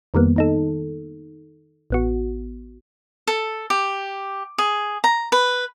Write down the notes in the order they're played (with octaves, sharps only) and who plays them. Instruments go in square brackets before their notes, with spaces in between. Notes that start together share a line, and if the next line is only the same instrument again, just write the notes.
[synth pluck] F2 D#3 G3 A#3 B3
D#3 D#4 A4
A1 B3 F#4
[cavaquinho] A4
G4
G#4
A#5
B4